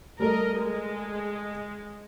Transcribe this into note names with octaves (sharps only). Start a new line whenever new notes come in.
G3 A3 A4 A#4 D#5
G#3